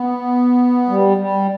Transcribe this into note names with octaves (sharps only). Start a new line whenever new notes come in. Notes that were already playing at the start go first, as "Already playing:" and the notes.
Already playing: B3
G3
G3